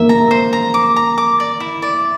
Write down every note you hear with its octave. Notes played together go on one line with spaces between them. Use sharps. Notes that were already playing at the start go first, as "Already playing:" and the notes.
Already playing: A#3 E5
A#5
C5
A#5
D6
A#5
D6
D5
E4
D5